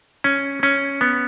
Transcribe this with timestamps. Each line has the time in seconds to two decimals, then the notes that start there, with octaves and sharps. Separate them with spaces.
0.24 C#4
0.63 C#4
1.01 B3